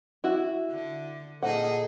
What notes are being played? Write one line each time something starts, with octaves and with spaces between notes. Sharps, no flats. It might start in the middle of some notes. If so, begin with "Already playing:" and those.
E4 F#4
D3
A#2 D#4 G#4 A4 F#5